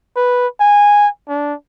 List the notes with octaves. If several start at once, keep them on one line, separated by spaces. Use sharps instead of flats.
B4
G#5
D4